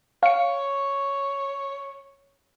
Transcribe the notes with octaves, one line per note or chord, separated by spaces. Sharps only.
C#5 F5 C#7